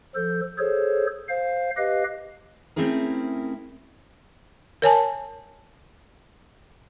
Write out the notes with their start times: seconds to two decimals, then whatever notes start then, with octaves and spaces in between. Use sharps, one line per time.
0.15 F3 A4 G6
0.58 G#4 A4 C5 C#5
1.29 C5 F5
1.77 G4 B4 D#5 F5
2.76 A3 C4 C#4 E4 G#4 A#4
4.82 A#4 C#5 G#5 A5